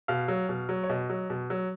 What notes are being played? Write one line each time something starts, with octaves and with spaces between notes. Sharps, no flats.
B2 F5
F#3
B2
F#3
C#5
B2 D#5
F#3
B2
F#3